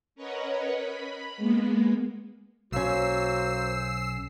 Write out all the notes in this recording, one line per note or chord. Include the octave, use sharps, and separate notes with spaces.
C#4 A#4 B4 C#5 D#5 F#5
B5
G#3 A#3 B3
B1 A#3 C#4 F#4 C5 E6 C7